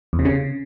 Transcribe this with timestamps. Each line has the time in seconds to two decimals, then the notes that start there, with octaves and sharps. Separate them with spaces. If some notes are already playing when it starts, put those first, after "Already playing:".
0.13 E2
0.19 C3
0.25 C#3